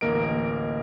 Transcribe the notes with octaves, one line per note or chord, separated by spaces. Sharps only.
A1 D2 A#3 A#4 D#5 D7